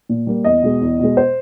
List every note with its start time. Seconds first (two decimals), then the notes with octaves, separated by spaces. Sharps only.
0.09 A#2
0.27 G3 A#3
0.44 E2 D#5
0.63 B2 G#3
0.81 E2
0.99 B2 G#3
1.17 C5